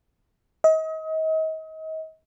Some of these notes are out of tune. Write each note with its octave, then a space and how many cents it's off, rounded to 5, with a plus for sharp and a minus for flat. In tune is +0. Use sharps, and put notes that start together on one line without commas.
D#5 +35